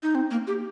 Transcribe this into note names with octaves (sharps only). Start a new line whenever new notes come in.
D#4
C4
A#3
G4